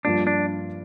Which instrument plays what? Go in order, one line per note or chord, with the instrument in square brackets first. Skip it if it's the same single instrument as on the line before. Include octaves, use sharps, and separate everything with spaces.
[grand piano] G2 F3 A#3 F4 [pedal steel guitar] D4
[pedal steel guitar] D4